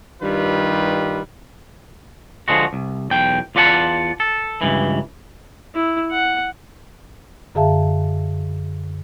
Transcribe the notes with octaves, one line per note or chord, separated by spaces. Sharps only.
G2 D#3 G3 F4 B4
D3 F3 G#3 F#4
C2
B1 E2 G5
E2 F4 D5 F#5 A5
A4
C#2 G2 E3
E4
F#5
F#2 D3 G#4 E5 F5 A5